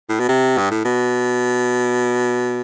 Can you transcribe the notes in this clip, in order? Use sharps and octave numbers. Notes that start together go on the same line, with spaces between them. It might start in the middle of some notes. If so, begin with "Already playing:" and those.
A2
B2
C3
G2
A2
B2